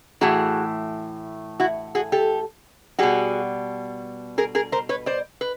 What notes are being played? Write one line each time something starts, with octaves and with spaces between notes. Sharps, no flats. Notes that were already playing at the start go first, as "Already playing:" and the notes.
A2 E3 A3 F#4 G#4
E4 F#4
F#4 G#4
G4 A4
B2 G3 F#4 G#4
G#4 A#4
G#4 A#4
A#4 C5
B4 C#5
C5 D5
B4